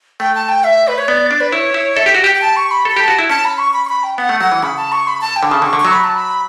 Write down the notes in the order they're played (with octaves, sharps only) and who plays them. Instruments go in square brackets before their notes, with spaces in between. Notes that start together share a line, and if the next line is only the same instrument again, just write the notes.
[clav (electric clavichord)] A3 [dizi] G5
[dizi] A5
G5
E5
B4
C#5
[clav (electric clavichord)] B3 [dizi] D5
[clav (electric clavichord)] D4
[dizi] B4
[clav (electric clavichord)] E4 [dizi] C#5
[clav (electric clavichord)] E4
[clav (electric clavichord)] A4 [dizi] E5
[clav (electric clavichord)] G4
F#4
[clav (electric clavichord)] G4 [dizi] G5
[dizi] G5
A5
C#6
B5
[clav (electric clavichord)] A4 [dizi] B5
[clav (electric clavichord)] G4 [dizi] A5
[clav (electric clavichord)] F#4
E4
[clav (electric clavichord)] C#4 [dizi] A5
[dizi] B5
C#6
B5
C#6
B5
G5
[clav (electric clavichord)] B3 [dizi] F#5
[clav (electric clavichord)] A3
[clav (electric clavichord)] F#3 [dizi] F#5
[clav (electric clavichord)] E3
[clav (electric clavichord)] C#3 [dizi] B5
[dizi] A5
C#6
B5
A5
G5
[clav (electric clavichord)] D3
[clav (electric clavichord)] C#3 [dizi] A5
[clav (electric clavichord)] D3
[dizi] C#6
[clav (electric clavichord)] D3
[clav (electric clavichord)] F#3 [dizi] C#6
[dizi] B5
A5
B5